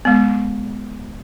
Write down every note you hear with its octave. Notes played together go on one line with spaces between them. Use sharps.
G#3 B3